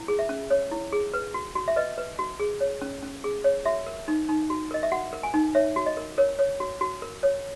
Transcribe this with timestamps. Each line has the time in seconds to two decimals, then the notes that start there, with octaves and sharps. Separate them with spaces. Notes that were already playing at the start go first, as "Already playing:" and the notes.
Already playing: E4
0.08 G#4
0.19 E5
0.29 C#4
0.50 C#5
0.71 E4
0.93 G#4
1.14 B4
1.34 F#4
1.55 F#4
1.68 E5
1.76 B4 D#5
1.98 B4
2.19 F#4
2.40 G#4
2.61 C#5
2.81 C#4
3.02 C#4
3.24 G#4
3.44 C#5
3.66 F#4 E5
3.87 A#4
4.08 D#4
4.29 D#4
4.50 F#4
4.71 A#4 D#5
4.83 E5
4.92 F#4 F#5
5.13 A#4
5.23 G#5
5.34 D#4
5.55 C#5 E5
5.76 F#4
5.86 D#5
5.97 A#4
6.18 A#4 C#5
6.39 C#5
6.60 F#4
6.81 F#4
7.02 A#4
7.23 C#5